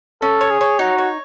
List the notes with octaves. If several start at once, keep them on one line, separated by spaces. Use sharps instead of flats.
C#4 A4
C#5
G#4
C#5
D#4 F#4
C#5